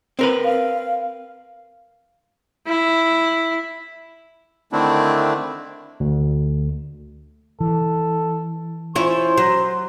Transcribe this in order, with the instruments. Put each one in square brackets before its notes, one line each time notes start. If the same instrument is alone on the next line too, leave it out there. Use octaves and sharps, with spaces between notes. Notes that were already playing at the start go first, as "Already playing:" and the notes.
[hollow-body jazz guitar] C4 A#4 B4
[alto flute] F5
[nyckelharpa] E4
[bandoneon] D3 D#3 A3 C4 D4 E4
[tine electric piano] D2
[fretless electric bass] E3 [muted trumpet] A4
[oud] C#4 E4 F4 [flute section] C5 [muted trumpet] C6
[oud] F#3